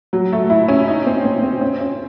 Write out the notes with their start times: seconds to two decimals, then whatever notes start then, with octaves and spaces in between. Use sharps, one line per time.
0.13 F#3
0.32 A3
0.50 E4
0.68 C#4
0.87 D#4
1.07 C4
1.25 C4
1.44 C4
1.61 C#4
1.81 C#4